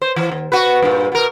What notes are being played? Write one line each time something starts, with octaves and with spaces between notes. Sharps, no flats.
C5
E3
D#2
F#4 B4
G2 A#2
B2 A#4